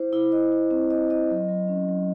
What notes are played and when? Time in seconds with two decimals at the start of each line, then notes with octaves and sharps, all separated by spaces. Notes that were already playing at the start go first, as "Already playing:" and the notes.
Already playing: E4 C5
0.13 E4
0.32 D#5
0.52 E4
0.71 C4
0.91 D#5
1.10 D#5
1.30 F#3
1.49 F#3
1.68 C#4
1.88 F#3